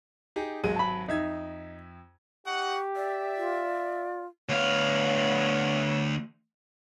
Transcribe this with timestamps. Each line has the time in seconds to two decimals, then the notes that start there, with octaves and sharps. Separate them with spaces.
0.36 D#4 G4 G#4
0.64 G#1 F#3 G#3 D#7
0.76 A5 B5
1.08 F2 D#4 E5 G#6
2.46 D#4 G4 F#5 C#6
2.96 D5 E5
3.37 F4
4.49 D2 B3 B4 C#5 F5